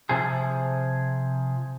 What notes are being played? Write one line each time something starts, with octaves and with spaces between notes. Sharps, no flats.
C3 F3 G#4